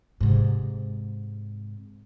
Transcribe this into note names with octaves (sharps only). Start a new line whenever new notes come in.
G#2 C3